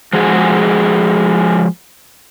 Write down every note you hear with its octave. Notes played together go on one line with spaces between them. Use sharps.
F3 G#3 F#4 G#4